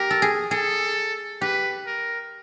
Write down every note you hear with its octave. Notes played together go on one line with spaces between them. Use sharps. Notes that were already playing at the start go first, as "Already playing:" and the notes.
Already playing: G4 A#4
A4
G#4
G#4 A4
G4 B4
A#4